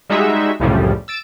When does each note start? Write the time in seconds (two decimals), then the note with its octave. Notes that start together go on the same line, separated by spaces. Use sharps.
0.10 G3 G#3 D#4 F#4 E5
0.60 C2 F#2 A2 C#3 F3 G3
1.08 E6 A6 D7